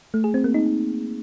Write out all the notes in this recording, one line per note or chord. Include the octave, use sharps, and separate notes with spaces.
A3
G#4
C4
A#3
D#4